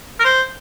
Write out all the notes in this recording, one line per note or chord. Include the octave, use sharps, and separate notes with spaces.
A#4
C5